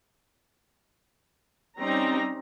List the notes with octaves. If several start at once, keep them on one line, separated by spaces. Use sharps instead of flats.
G3 C4 C#4 D#4 A#5